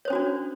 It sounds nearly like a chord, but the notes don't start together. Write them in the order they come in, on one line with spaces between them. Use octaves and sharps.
C#5 C5 C#4 F#4 D4